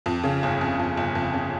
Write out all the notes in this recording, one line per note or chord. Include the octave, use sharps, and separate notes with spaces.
F2
C#3
G1
F2
F2
G1
F2
C#3